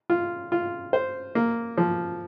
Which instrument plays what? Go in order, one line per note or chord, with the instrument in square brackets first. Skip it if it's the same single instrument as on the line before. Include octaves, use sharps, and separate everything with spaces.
[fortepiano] F4
F4
C5
A#3
F3